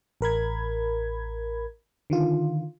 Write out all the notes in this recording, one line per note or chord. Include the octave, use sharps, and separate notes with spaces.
A1 A#4 B5 G#6
D3 D#3 F4